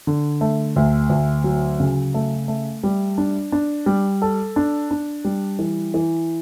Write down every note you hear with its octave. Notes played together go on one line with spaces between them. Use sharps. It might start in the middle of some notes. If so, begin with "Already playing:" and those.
D3
A3
D2
D2
F#3
C#3
A3
A3
G3
D4
D4
G3
A4
D4
D4
G3
E3
E3